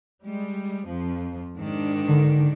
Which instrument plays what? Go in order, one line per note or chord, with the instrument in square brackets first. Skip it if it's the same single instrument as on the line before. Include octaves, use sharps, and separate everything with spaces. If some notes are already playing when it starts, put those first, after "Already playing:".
[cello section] G3 G#3
F2 F3
G#2 D#3 D4
[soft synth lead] D3